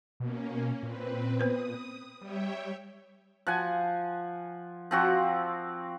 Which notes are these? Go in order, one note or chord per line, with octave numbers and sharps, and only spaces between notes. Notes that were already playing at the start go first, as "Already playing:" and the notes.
B2 A#3 C#4
A#2 C4 B4
B3 B4 C5 D#6
G3 C#5 E5 G5
F3 F#5 G#5
F3 C4 F#4